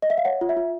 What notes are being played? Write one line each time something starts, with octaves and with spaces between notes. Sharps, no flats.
D#5
E5
F5
C#5 F#5
F4
E5
F4